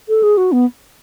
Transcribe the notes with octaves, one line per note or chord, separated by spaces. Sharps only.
A4
G#4
F#4
B3